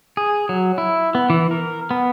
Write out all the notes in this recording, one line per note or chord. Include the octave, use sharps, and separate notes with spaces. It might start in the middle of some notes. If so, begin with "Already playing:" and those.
G#4
F#3
E4
B3
E3
A#4
B3